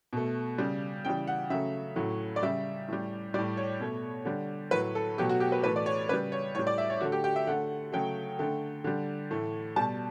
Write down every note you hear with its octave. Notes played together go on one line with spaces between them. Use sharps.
B2 A3
C#3 G3
C#3 E3 G3 G5
F#5
C#3 F#3 A3 E5
A2 F#3 A3
D5
C#3 G3 E5
A2 G3
A2 G3 D5
C#5
B2 A3
D3 G3
A2 F#3 A3 B4
A4
B2 F#3 A3 G4
F#4
G4
B4
A2 E3 A3 B4
D5
C#5
C#3 G3 B4
C#5
A2 G3 C#5
D5
E5
C#5
D3 A3 F#4
G4
G4
E5
D3 A3 F#5
C#3 F#3 A3 G5
D3 A3
D3 G3
A2 E3 A3
B2 G3 A5